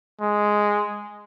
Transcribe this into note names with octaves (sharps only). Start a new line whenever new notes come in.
G#3